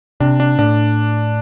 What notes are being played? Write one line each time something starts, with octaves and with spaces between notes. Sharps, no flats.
C3 D4
D4
A2 D4